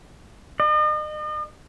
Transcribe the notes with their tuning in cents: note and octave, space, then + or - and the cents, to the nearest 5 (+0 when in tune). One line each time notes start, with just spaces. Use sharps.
D#5 -40